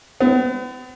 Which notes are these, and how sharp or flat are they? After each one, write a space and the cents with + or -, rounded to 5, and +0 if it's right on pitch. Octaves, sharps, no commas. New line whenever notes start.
B3 +45